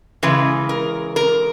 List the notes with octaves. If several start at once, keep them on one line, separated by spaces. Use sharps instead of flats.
C#3 E3 G#3 B4
A#4
A#4